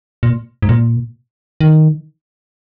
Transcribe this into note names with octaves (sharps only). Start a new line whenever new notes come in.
A#2
G#2
A#2
D#3